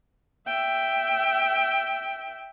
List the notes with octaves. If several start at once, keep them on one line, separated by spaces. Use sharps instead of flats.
E5 G5